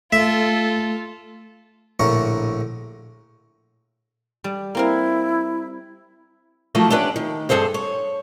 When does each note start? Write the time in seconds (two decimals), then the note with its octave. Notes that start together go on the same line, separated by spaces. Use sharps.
0.12 A3 F4 A4 E5
1.99 A#1 A2 D3 A#4 C#6
4.44 G3
4.75 A#3 C4 E4 A#4
6.75 F3 F#3 A3 A#3 E4 F4
6.90 A3 B3 C#4 D4 G4 B4
7.16 D#3
7.49 G2 G#4 A4 C5 F5
7.74 C#5